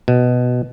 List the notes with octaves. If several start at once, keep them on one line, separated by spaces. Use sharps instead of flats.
B2